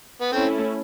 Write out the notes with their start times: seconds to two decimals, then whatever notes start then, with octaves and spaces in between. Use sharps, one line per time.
0.21 B3
0.32 A3 C4 C#4 E4 A4